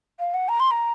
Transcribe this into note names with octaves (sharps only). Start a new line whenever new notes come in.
F5
F#5
A#5
C6
A#5